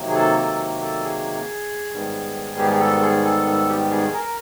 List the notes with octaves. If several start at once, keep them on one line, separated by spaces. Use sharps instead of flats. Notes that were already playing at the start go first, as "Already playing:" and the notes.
Already playing: C3 D#3 F#3 A#3
G#4
A4
A4
A4
G#4
G#2 D#3 G3 B3
G4
G#4
A4
A4
G#4
A4
A4
G4
G#4
A#4